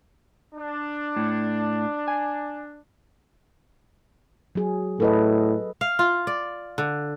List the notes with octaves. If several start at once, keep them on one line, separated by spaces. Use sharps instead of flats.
D4
A2
G#5
F#3 G#4
A2 A4 B4 D#5
F5
F4
D5
D3